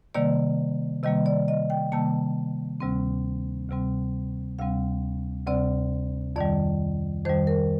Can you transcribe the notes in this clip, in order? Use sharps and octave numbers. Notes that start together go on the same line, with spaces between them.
C3 D#3 G3 A#3 D5
C3 D#3 G3 A#3 D#5
D5
D#5
G5
C3 D#3 G3 A#3 A5
D2 C3 G3 C4
D2 C3 G3 C4
D2 C3 G3 C4 F5
D2 C3 G3 C4 D5
F2 D#3 G3 D5
F2 D#3 G3 C5
A#4